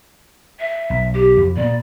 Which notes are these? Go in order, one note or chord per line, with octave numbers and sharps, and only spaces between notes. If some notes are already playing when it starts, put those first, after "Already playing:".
E5
B1
G4
F2
A#2 B3 D5